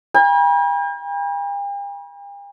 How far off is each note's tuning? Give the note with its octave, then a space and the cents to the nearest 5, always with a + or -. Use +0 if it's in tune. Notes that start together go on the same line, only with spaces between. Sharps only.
G5 +45 B5 -45